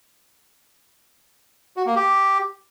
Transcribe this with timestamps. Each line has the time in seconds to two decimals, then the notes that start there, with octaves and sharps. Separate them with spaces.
1.77 F#4
1.86 A#3
1.96 G4